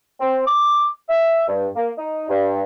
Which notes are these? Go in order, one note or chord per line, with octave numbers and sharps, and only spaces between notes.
C4
D6
E5
G2
A#3
D#4
G2